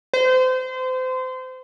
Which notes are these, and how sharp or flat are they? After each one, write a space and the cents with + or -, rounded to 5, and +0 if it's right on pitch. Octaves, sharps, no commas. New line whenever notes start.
C5 -30